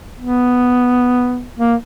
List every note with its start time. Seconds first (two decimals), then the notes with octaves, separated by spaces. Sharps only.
0.20 B3
1.59 A#3